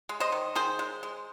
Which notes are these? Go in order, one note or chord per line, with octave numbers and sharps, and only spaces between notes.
G#3
C5 D#5
D#3
D#3 G#4 C5
G#3
G#3